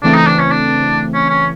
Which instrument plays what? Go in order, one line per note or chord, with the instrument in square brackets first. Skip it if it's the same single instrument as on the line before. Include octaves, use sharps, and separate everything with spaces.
[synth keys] C#3 E3 A3 C4 [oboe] D4
[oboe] D#4
D4
C#4
D4
C#4
C#4